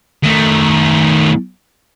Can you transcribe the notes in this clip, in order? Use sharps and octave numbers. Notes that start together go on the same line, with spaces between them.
D#3 A3